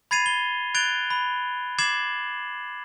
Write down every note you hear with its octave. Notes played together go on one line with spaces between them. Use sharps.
B5 G#6 A6 C7 D#7 F7
G7
F#6 G#6 A6 D7 F7 G7
B5
D6 G#6 A6 C7 E7 F#7